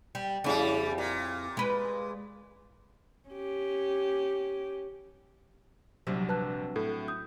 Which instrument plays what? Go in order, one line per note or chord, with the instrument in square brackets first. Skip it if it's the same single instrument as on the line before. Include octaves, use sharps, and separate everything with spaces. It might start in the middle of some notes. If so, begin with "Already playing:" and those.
[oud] G3
[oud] F2 E4 [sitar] C#3 G3
[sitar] A#2
[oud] G#3 B4
[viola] C#4 G4
[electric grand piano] A#1 C3 G3 [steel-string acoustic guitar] F#3 C4 D4
[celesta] B4 A5 F#6
[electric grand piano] A2 [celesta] A4
[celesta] D#6 G6